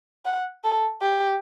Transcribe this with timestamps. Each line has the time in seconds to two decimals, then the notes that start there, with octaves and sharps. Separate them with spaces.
0.25 F#5
0.64 A4
1.02 G4